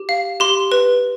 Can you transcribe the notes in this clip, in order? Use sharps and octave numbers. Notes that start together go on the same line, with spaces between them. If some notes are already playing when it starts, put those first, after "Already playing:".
Already playing: G4
F5
G4 C6
B4